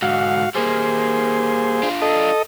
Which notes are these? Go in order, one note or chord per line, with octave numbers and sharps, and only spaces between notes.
G#2 D3 F#4 F5
G3 A#3 G#4 C5
D4 F4
A4 D#5